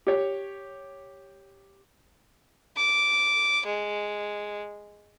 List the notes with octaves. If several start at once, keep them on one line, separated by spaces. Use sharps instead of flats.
G4 C#5
D6
G#3